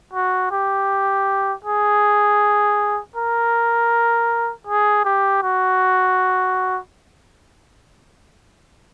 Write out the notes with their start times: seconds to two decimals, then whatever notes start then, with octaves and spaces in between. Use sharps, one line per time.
0.13 F#4
0.51 G4
1.64 G#4
3.16 A#4
4.67 G#4
5.05 G4
5.43 F#4